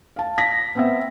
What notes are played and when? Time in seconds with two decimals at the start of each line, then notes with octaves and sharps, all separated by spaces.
0.16 F5 A5
0.38 A#6 B6
0.75 B3 C4 E5